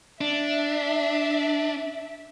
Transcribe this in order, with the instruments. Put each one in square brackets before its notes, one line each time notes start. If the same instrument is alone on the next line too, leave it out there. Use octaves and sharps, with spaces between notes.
[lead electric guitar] D4 [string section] E5